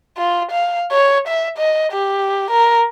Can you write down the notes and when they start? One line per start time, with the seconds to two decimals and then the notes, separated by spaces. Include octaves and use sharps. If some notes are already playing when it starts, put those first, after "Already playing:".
0.17 F4
0.51 F5
0.92 C#5
1.28 E5
1.58 D#5
1.92 G4
2.51 A#4